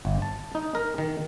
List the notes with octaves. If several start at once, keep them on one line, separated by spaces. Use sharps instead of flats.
G1
A5
D#4
A#4
D#3